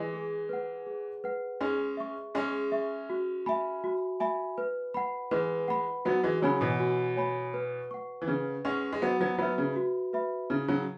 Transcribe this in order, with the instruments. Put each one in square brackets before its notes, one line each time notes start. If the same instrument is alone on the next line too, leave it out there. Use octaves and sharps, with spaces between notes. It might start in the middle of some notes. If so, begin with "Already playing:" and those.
Already playing: [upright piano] E3 G#3
[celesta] G#4
B4 F#5
G#4
B4 F#5
[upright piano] G#3 C#4 [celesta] G#4
[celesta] E5 C#6
[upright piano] G#3 C#4 [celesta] G#4
[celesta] E5 C#6
F#4
E5 G#5 B5
F#4
E5 G#5 B5
B4
F#5 B5
[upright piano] E3 G#3 [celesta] B4
[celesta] F#5 B5
[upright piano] F#3 B3 [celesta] F#4
[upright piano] E3 G#3
[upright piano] C#3 F#3 [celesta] C#5 G#5 B5
[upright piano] B2 E3
[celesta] F#4
C#5 G#5 B5
B4
F#5 C#6
[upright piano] E3
[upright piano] C#3 [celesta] B4
[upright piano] G#3 C#4 [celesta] F#5 C#6
[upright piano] G#3
[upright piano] F#3 B3 [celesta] F#4
[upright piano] F#3 B3
[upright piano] F#3 B3 [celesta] B4 E5 B5
[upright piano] C#3
[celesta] F#4
B4 E5 B5
[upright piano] C#3 [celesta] E4
[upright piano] C#3 F#3